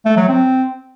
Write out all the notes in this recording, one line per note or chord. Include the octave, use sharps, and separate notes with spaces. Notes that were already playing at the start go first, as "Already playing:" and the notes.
A3
F#3
C4